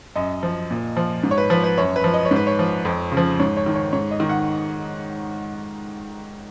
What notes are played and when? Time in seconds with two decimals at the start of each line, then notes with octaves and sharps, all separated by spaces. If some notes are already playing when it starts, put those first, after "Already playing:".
0.16 F#2 D#5
0.43 F3
0.71 A#2
0.97 F3
1.23 G#2
1.31 C#5
1.38 B4
1.50 F3 B4
1.64 B4
1.77 F#2 C#5
1.96 B4
2.04 F3
2.14 D#5
2.25 C#5
2.31 G#2
2.36 B4
2.47 C#5
2.59 F3
2.85 F2
3.12 C#3
3.17 F3
3.39 G#2 C#5
3.57 C#5
3.66 D#3
3.76 C#5
3.93 G#2 C#5
4.11 D#5
4.20 D#3
4.29 F#5